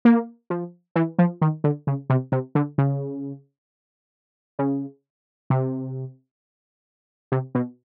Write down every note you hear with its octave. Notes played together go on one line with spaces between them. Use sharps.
A#3
F3
E3
F3
D#3
D3
C#3
C3
C3
D3
C#3
C#3
C3
C3
B2